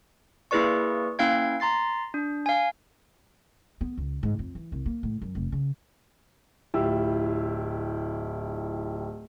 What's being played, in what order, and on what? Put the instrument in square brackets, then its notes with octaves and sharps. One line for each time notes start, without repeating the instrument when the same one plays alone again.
[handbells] A#3 E4 G#4 B4 D5 C#6
A#3 C#4 E4 F5 G5 G#6
A#5 C6 A6 C7
D4
F5 G#5
[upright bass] B3
C#2
G#2
F2
E3
C2
A#3
A2
F#2
F1
C#3
[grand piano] D1 E4 F4 G4 E6